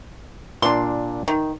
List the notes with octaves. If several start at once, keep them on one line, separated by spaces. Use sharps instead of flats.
A#2 D4 C6
D#3